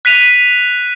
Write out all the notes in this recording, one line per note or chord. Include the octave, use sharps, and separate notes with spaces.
F#6 B6 D#7 F7